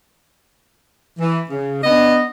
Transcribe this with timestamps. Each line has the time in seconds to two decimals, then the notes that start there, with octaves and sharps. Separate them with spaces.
1.20 E3
1.50 C#3
1.84 B3 D4 D#5